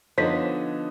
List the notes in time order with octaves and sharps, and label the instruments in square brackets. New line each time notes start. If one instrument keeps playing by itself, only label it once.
[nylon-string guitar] D3 F3 D#4 [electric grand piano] B3 C#5 D#5 [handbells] C5 B6